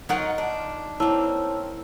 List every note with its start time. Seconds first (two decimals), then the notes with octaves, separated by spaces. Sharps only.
0.09 F#3 D#4 F4 A#4 F#5
0.38 D4
1.00 A#3 C4 E4 C#5 A5 E6